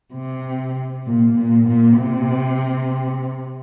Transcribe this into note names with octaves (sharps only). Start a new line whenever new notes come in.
C3
A#2
A#2
A#2
C3